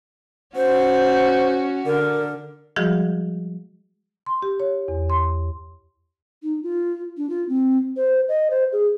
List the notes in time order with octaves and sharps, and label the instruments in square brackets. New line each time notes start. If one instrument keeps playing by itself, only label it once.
[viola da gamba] C#4 F#4 [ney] C5
[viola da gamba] D3 [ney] A#4
[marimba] F3 G3 G#3 F#4 G#4
C6
G4
C#5
E2
C6
[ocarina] D#4
F4
D4
F4
C4
C5
D#5
C5
G#4